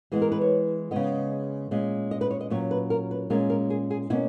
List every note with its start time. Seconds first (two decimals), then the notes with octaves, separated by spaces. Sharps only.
0.12 E3 G#3 B3 G#4
0.22 A#4
0.32 B4
0.41 C#5
0.91 C#3 G#3 B3 D#5
1.71 A#2 G#3 C#4
2.11 D#5
2.21 B4
2.31 C#5
2.41 D#5
2.50 A#2 F#3 C#4 C#5
2.71 B4
2.90 A#4
3.11 B4
3.30 A#2 G#3 C#4 A#4
3.50 A#4
3.70 G#4
3.91 G#4
4.10 B2 A#3 C#4 E4